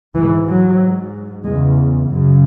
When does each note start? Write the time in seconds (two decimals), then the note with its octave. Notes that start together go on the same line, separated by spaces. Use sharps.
0.15 G#2 E3
0.47 F#3
0.81 G#2
1.45 E2 C#3 G#3
2.08 F#2
2.14 C#3